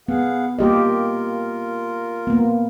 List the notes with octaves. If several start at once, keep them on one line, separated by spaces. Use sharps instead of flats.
B3 G#4 F5 F#5
A#3 F4 G4 A#4 D#5
A#3 B3